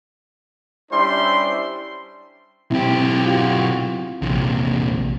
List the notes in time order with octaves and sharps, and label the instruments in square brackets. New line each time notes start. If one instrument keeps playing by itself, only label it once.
[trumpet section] G3 C#4 D4 E4 C5 C6
[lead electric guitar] B1 G4 [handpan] C4 E4
[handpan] F4 F#4
[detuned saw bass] A#1 [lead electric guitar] E2 C3